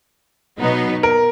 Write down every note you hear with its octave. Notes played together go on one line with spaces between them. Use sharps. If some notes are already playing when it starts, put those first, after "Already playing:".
B2 F#3 B3 D#4
A#4